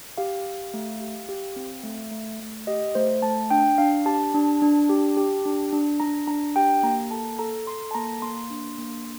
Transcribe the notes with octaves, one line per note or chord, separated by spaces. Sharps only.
G4 F5
G4
A3
G4
G4
C4
A3
A3
A3
G4 D#5
A3 C5
A3 A5
D4 G5
D4 F5
G4 A5
D4
D4
G4
G4
D4
D4
D4 A#5
D4 A#5
G4 G5
A#3 A#5
A4 A5
A4 A#5
A4 C6
A5
A#3 A#5
A#3 C6
D4
A#3